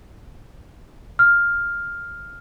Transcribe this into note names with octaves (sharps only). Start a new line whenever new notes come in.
F6